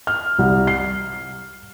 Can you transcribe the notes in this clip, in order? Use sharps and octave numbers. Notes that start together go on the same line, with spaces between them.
F6
C2
C7